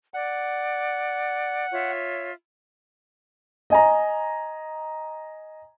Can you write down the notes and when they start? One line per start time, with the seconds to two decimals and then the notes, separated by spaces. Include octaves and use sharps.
0.14 D5 F#5
1.73 F4 C#5 E5
3.70 D#5 G#5 A#5